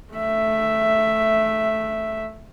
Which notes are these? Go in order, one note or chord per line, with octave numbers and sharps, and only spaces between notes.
A3 E5